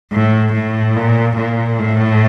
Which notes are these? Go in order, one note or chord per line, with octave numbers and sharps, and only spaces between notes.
A2
A2
A#2
A#2
A2